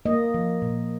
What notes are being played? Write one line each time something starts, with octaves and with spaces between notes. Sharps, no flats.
A#3 D#5
F3
A#2